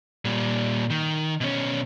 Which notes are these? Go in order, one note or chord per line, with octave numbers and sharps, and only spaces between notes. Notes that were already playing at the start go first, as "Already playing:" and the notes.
A#2 G3
D#3
B2 C#4